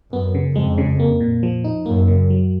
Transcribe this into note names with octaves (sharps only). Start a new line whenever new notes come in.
F#2 B3
C#3
F2 G#3
C#3
A#3
A#2
F3
D#4
F#2 A#3
C#3
F#3